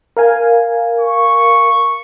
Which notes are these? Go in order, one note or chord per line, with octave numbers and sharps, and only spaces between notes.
A#4 F5 G#5
C#6